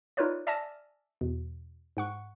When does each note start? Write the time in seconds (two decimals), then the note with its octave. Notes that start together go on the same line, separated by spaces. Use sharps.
0.17 D#4 F4 A#4 B4 C#5 D5
0.47 D5 E5 G#5 A5 F6 A#6
1.21 E2 B2
1.97 G#2 F#5 C#6